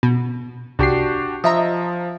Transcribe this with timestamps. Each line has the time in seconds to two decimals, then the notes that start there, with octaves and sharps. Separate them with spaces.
0.03 B2
0.79 C2 D4 F#4 G4 C7
1.44 F3 D#5 E5 A#5